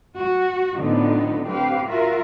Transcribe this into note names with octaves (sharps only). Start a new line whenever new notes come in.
F#4
A2 D3 F3 B3 C#4 D#4
C4 G4 B4 F5
F4 F#4 A#4 E5